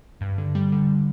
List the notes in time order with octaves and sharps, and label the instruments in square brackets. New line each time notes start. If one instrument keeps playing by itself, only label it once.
[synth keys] G2
D3
G3
D3